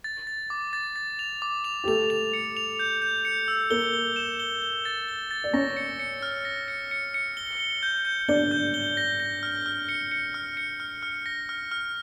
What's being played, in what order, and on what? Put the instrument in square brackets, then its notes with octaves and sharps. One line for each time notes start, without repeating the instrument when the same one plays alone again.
[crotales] A6
A6
D6
A6
A6
F7
D6
F7
[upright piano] G4
[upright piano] A3 A4 [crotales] F7
[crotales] F7
C#7
F7
G6
G6
C#7
E6
[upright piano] A#3 A#4 [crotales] G7
[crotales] G7
E7
G7
G7
A6
G7
A6
[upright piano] D5
[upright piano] C#4 C#5 [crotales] A#6
[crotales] C#7
C#7
F6
A#6
C#7
C#7
C#7
G7
G7
G6
G6
[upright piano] D4 D5 [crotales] G7
[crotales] G6
G7
A#6
A#6
F6
F6
C#7
C#7
F6
C#7
F6
F6
A#6
F6
F6